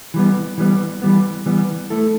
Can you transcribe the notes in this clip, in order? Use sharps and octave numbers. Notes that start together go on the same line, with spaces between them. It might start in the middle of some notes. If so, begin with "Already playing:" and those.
E3 G3 B3
E3 G3 B3
E3 G3 B3
E3 G3 B3
A3 E4 A4